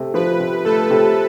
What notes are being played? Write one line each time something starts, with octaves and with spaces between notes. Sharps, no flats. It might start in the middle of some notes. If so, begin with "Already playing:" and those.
Already playing: C3 A3
F3 B4
C3
A3 A4
C3